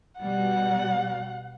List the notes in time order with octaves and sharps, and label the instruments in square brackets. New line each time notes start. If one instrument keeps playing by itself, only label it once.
[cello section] B2 G3 [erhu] F#5